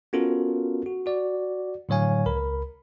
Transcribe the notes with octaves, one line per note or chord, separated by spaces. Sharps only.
B3 C#4 F4 F#4 A4 A#4
F#4
F#4 D5
A2 D3 F#3 C#5 F5 G#5
C#2 A#4 B5